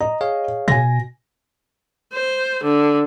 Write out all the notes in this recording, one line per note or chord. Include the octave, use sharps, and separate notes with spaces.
D#5 A#5
G#4 C#5 F5
B2 G#5 A#6
C5
D3